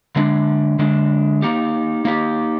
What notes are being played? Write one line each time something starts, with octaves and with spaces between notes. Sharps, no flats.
D3 G#3 D4
D3 G#3 D4
A#3 D#4 G4
A#3 D#4 G4